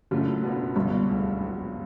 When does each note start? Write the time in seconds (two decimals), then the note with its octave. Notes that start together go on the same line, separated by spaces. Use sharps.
0.11 F#1 F#2 A2 F#3 A3 D4 F4
0.43 B2 F#3 B3 D4 F4
0.76 G1 C2 G2 C3 F3
1.08 D2 C#3 F3
1.40 A#1 G#2 D#3 F#3